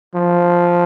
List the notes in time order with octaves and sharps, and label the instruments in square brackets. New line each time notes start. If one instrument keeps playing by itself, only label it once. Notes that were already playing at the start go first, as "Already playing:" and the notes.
[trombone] F3